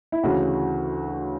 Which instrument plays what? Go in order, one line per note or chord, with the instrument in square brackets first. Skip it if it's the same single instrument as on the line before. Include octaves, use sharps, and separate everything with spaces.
[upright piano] E4
D2 C#3 E3 F#4